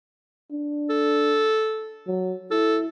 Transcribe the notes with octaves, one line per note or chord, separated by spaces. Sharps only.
D4
A4
F#3
E4 A4